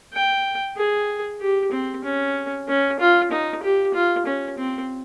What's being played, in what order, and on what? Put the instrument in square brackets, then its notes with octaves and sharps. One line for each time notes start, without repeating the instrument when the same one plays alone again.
[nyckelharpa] G5
G#4
G4
C4
C#4
C#4
F4
D#4
G4
F4
C#4
C4